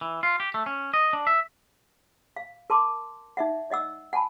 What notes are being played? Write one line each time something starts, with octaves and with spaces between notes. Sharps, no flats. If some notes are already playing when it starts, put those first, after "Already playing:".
E3
F4
G4
A3
C#4
D#5
D4
E5
F5
A#4 A5 C6 D6
D#4 E5 F#5
D5 D#5 F#5 E6
F#5 G#5 A5 B5